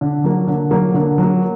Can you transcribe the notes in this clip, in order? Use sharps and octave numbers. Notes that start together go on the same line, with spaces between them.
D3
F#3 A#3
D3
F#3 A#3
D3
F#3 A#3